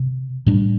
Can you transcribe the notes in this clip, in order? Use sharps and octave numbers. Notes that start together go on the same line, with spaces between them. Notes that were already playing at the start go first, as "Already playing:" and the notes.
Already playing: C3
A2 G3 D4